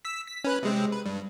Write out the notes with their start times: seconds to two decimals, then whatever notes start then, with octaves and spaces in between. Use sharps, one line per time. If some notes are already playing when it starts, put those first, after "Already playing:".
0.05 E6 B6
0.27 B6
0.44 C#4 B4 F#6
0.63 C3 G#3 C4
0.92 B4
1.06 G2